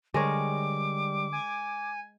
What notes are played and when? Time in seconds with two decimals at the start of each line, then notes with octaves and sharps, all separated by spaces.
0.14 D3 G3 G#3 A#4 C#5 D6
1.33 G#5